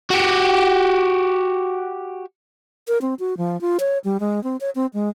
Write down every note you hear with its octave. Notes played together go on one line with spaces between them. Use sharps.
F#4 G4
A#4
C4
F#4
F3
F4
C#5
G3
G#3
C4
C#5
C4
G#3